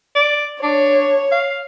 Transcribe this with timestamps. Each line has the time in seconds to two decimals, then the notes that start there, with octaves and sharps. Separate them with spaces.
0.15 D5
0.63 D4 C#5
1.32 F5